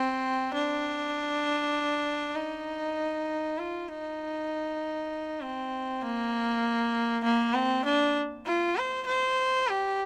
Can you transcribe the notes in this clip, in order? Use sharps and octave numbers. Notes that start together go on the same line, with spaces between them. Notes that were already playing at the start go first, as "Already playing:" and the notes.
Already playing: C4
D4
D#4
F4
D#4
C4
A#3
A#3
C4
D4
F4
C5
C5
G4